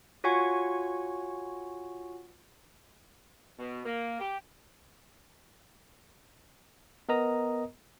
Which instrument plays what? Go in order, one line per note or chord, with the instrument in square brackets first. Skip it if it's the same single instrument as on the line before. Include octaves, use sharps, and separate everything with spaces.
[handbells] F4 F#4 C#5 F#5 G#5 C#6
[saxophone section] B2
A#3
G4
[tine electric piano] B3 A#4 D#5 A#5 D#6